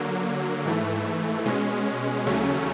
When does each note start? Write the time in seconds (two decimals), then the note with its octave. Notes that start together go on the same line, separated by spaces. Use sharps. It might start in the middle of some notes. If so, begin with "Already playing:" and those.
Already playing: D3 F#3 A#3
0.65 G#2 E3 A3
1.45 B2 G#3 C#4
2.26 D#2 C#3 F#3 A3 C#4